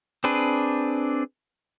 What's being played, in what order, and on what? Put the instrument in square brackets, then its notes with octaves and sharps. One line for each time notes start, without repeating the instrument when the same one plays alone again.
[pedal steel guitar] C4 D4 G#4 B4